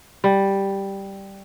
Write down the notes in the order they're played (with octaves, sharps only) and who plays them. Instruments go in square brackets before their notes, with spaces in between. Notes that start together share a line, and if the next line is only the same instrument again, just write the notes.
[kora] G3